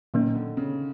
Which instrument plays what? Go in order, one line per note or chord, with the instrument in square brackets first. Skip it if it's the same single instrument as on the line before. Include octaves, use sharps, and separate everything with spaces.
[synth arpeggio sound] A#2 F#3 A#3 C#4 [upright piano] D#3
[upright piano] D3
C#3